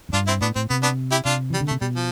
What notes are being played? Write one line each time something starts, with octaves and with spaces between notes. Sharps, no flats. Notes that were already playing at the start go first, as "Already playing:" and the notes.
F2
G2 D4 F4
C4 E4
A2 B3 D4
A2 C4
C3 B3
B3 D4
E4 G4
C3 D4 F4
E3 G3
D3
A3
C3
B2 G3
F3